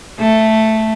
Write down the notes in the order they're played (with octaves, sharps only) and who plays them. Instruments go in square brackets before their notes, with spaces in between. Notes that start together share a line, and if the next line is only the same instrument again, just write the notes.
[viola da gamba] A3